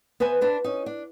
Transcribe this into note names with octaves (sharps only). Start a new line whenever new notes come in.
B3 B4 C5 E5 G#5
D4 B4 C5
C#4 D#4
D4